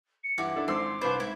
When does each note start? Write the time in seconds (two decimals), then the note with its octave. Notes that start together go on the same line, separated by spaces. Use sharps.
0.23 C#7
0.38 G2 E3 E4 F#4 D6
0.56 D4 E4 A4
0.68 G#1 C4 C6 D6 E6
1.01 C2 B3 C4 D4 C5
1.20 G#2 E4